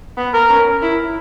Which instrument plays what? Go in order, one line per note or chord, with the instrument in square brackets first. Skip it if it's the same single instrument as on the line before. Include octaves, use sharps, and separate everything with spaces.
[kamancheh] B3
[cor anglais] A#4
[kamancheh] C#4
E4